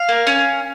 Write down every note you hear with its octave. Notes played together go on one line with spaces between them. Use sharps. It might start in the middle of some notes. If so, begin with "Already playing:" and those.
Already playing: F5
A#3
C#4